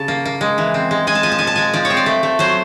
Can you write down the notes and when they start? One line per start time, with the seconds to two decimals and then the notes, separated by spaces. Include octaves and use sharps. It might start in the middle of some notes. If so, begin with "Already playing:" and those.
Already playing: C#3 A5
0.08 A#3
0.25 A#3
0.41 G#3
0.58 E3
0.74 C4
0.91 G#3
1.07 G#3 G#5
1.15 A5
1.23 F3 G#5
1.32 A5
1.39 A#2 G#5
1.47 A5
1.56 G#3 G#5
1.74 F3 D5
1.85 C#5
1.90 C4
1.97 D5
2.06 A3
2.23 A3
2.39 F#3 C5